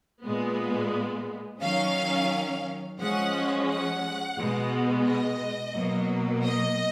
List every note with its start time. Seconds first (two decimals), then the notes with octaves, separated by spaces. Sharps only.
0.23 A#2 G#3 B3
1.61 D#3 F#3 C#4 F5
2.99 F3 G#3 C#4 F#5
3.68 F#5
4.37 B2 G#3 B3
5.05 D#5
5.74 B2 F#3 A#3
6.43 D#5